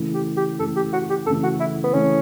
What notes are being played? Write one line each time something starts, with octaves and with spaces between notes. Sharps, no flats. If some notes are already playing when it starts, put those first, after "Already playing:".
Already playing: C#3 E3 A3
G4
G4
C#3 E3 A3 A4
G4
F#4
G4
C#3 E3 A3 A4
F#4
E4
B3
C#3 E3 A3 C#4